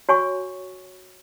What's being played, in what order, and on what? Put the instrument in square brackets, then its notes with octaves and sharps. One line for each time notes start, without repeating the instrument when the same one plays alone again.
[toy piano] F#4 C#5 G#5 C#6